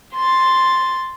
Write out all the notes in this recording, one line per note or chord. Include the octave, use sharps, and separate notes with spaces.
C6 A6